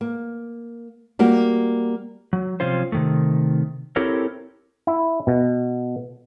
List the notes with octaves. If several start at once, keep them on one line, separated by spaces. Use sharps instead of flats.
A#3
G3 A#3 F#4
F#3
C3 D#3 F3 C#4 F4 C5
C3 D#3 A3
C4 E4 G4 A4 A#4 C#5
E4
B2